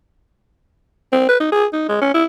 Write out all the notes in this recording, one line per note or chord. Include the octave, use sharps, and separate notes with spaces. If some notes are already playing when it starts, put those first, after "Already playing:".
C4
B4
D#4
G#4
D#4
G#3
C#4
E4